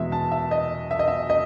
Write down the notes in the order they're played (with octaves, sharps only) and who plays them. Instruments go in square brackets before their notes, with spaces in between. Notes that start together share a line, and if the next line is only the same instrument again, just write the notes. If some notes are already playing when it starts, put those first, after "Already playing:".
Already playing: [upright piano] E2 B2 G#3 E5
A5
E5
D#5
E5
D#5
E5
D#5